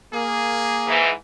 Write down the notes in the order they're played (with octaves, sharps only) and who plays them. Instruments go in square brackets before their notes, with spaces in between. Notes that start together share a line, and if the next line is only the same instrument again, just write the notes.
[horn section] A#3 G#4
[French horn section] G#2 E3